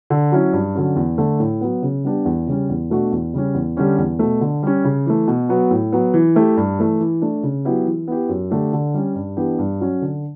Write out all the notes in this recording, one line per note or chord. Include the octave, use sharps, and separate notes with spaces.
D3
F#3 C#4 E4
G2
D3 F#3 C#4
E2
D3 A3
A2
F#3 B3
C#3
G3 B3 D4 G4
E2
C#3 G3 C#4
E2
B2 A3 D4 F#4
E2
C#3 G3 C#4
E2
D3 G3 C#4 G4
E2
B2 A3
D3
G3 C#4
C#3
E3 A3
B2
F#3 B3 F#4
A2
F#3 B3
E3
A3 E4 G4
G2
E3 A3
E3
A3 D4
C#3
F#3 B3 E4 G4
E3
B3 E4 G4
F#2
D3 A3 D4 G4
D3
G3 C#4
G2
E3 B3 D4 G4
G2
F#3 C#4
D3